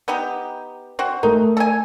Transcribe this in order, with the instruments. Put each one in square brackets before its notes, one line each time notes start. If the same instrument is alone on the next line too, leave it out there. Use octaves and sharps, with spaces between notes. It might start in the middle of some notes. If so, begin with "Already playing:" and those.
[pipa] B3 D#4 G4
C4 F#4
[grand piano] A3 A#4 [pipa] D#4
[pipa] A4 G#5